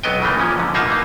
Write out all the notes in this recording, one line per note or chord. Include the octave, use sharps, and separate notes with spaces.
B1 F#3 B3 D#5 G5
C#3 E3 A3 A#3
A#2 F3 C#4
G#2 D3
B2 A#3 D#4 F4 E5 A5
E3 A#3 D#4